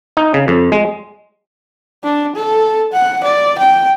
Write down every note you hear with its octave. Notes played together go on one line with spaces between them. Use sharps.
D#4
C#3
F2
G#3
D4
A4
F#5
D5
G5